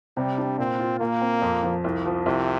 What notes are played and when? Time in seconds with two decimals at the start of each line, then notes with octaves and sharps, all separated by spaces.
0.17 C3 G3
0.38 D4
0.58 A#2 C4
0.79 F4
1.00 A#2 A#3
1.21 C4
1.42 F2
1.63 F3
1.84 C2
2.06 F3
2.26 C2 C3